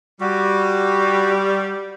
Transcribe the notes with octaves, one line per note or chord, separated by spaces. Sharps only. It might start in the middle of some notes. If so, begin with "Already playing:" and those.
G3 F#4